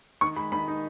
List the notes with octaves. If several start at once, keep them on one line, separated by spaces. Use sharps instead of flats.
D#3 C#6
G#3 B5
D#3 B5
D#4